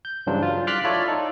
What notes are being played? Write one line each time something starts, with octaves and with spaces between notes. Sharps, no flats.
G6
G2 C#3 E3 F#3 D4 C5
F4
C6 D6 F6 F#6 A6 B6
E4 F4 A4 C#5 D5
D#4 A4